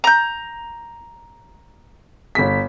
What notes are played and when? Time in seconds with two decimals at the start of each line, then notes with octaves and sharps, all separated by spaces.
0.04 A#5 G6
2.35 G1 B6